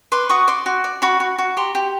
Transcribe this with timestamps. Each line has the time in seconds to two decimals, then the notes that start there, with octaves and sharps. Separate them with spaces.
0.12 B4 C6 D6
0.29 F#4 C#6 D#6
0.48 D5 C6 D6
0.66 F#4
0.84 D5
1.02 F#4 B5 C#6
1.20 F#4
1.38 F#4
1.57 G4 A#5 C6
1.75 G4